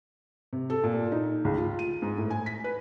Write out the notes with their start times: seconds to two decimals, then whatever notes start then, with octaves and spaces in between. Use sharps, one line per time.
0.53 C3
0.70 A4
0.83 A#2
1.12 D#4
1.45 C#2
1.58 F4
1.79 D#7
2.02 G#2
2.18 A2
2.31 G#5
2.46 B6
2.64 B4